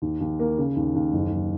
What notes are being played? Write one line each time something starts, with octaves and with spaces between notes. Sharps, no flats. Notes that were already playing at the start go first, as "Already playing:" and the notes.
D#2
D#2
A#3
C#3
D#2
D#2
F#1
F#1